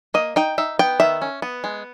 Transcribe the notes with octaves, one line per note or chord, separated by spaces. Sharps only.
A#3 D#5
D#4 G5
D#4 E5
B3 G5
D#3 E5
C#4
B3
G#3